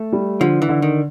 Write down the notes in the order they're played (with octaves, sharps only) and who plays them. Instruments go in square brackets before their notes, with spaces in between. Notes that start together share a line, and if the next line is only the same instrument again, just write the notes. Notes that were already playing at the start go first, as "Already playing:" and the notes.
Already playing: [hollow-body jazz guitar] A3
[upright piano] G3
[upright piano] D3 [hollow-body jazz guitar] F3
[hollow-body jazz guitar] E3
[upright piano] D3
[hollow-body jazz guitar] D#3